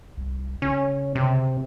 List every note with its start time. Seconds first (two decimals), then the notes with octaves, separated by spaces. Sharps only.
0.17 C2
0.62 C#3 C#4
1.15 C3